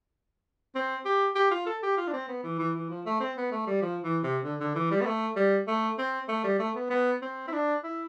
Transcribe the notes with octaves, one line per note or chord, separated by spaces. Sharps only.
C4
G4
G4
F4
A4
G4
F4
D4
C4
B3
E3
E3
E3
F3
A3
C4
B3
A3
G3
F3
E3
C3
D3
D3
E3
G3
B3
A3
G3
A3
C4
A3
G3
A3
B3
B3
C4
E4
D4
E4